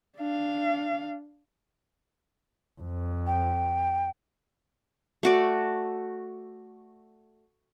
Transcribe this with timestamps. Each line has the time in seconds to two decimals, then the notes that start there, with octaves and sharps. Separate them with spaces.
0.18 D4 F5
2.81 F2
3.27 G5
5.23 A3 F#4 D5